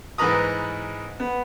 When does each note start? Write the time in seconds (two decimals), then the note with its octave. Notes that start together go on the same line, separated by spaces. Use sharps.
0.18 G#2 E3 A#4 B4 A#5 D#6
1.20 B3